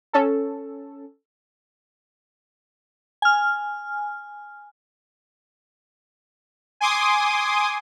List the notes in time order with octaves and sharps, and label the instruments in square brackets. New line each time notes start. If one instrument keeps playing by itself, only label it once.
[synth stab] C#4 A4
[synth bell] G#5 F6
[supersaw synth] G#5 C6 D6 D#6